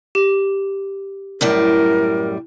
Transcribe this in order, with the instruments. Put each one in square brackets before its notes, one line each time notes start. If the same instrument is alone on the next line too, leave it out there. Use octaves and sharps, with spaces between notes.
[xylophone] G4
[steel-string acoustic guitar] F#2 A2 G3 [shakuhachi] A#4